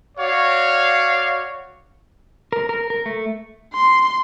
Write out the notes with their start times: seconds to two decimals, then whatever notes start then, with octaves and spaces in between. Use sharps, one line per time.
0.17 F#4 C#5 D5 F5
2.52 A#4
2.69 A#4
2.90 A#4
3.06 A3
3.74 C6